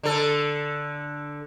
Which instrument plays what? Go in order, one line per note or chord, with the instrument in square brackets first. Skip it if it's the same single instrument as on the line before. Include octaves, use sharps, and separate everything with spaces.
[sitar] D3 A4